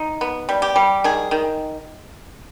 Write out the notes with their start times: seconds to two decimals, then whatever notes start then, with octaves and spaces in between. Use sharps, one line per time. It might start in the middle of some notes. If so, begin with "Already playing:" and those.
Already playing: D#4
0.21 B3
0.49 G3
0.62 G4
0.76 G3
1.04 D#3 G#4
1.31 D#3